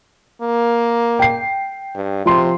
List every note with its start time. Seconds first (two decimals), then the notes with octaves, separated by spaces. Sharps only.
0.42 A#3
1.19 G5 C7
1.95 G2
2.26 C3 F3 C6